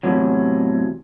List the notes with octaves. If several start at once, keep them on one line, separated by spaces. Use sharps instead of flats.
E2 A2 C3 F#3